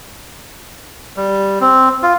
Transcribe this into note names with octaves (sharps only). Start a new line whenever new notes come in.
G3
C4
F4